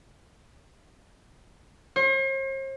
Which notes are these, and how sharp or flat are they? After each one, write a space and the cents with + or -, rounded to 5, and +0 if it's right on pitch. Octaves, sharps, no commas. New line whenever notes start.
C5 +45